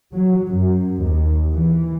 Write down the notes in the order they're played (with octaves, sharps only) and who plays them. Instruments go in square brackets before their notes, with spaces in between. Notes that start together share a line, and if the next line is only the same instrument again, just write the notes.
[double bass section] F#3
F#2
D#2
E3